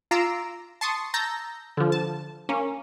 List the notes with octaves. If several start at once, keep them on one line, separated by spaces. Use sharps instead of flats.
F4 A#5 C6 D6 E6
A5 C6 C#6 D#6
A5 A#5 E6 G6 A#6
D3 F3
A5
A#3 C#4